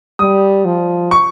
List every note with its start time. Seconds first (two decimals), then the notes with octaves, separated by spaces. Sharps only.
0.19 G3 D#6
0.65 F3
1.11 C#6